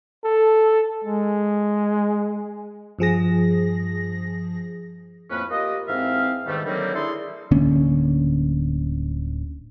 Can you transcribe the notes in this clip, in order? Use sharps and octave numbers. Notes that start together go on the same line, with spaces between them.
A4
G#3
G2 F3 G#4 A#6
F2 A2 A#3 C#4 B4
A#3 F4 G4 D#5
G#2 E3 C4 E5 F5
E2 G#2 D#3 G3 A3
D3 D#3 F#3 G3 A#3 C4
D4 E4 G#4 A4 C6
D1 D3 A#3 C#4